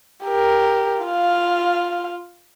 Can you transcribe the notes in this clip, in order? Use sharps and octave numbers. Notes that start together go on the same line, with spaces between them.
G4 A#4
F4 F5